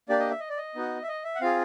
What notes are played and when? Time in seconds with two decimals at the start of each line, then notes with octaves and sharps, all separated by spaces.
0.09 A#3 D4 G4 D5
0.20 D#5
0.31 E5
0.40 D#5
0.49 D5
0.57 D#5
0.75 B3 D#4 F#4
1.03 E5
1.08 D#5
1.24 E5
1.35 F#5
1.41 C4 F4 G#4 F5